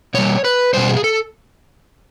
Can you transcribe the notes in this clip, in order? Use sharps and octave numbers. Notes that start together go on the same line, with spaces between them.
B2 G3 C#5
B4
B2 G3 C5
G#4
A4